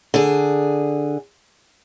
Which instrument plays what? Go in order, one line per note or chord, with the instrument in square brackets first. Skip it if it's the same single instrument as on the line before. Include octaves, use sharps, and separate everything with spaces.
[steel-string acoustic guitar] D3 G#4